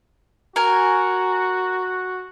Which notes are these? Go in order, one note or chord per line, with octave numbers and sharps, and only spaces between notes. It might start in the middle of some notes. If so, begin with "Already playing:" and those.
F#4 A#4 G#5